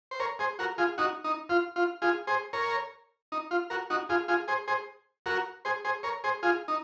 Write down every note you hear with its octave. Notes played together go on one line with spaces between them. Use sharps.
C5
A#4 C#5
G#4 C5
F#4 A#4
F4 G#4
D#4 F#4
D#4
F4
F4
F4 G#4
G#4 C5
A#4 C#5
D#4
F4
F#4 A#4
D#4 F#4
F4 G#4
F4 G#4
G#4 C5
G#4 C5
F#4 A#4
G#4 C5
G#4 C5
A#4 C#5
G#4 C5
F4 G#4
D#4